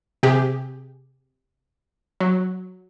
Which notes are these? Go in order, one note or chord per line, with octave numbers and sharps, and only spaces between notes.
C3 G4 G#4
F#3